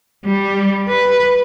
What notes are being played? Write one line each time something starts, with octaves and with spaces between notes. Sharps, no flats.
G3
B4